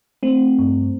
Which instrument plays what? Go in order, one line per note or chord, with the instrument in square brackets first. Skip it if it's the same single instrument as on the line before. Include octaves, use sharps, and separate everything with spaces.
[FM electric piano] A3 C4
G2